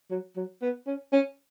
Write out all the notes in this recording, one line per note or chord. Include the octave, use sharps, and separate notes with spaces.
F#3
F#3
B3
C#4
C#4